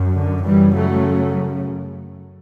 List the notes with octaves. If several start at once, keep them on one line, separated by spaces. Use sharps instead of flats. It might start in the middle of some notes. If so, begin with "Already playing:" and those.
Already playing: F#2
D3
F#2 C#3 E3 G3
F#3 A3